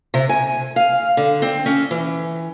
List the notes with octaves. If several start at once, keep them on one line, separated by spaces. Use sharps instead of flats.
C3
G#5
F5
D3
C4
C#4
E3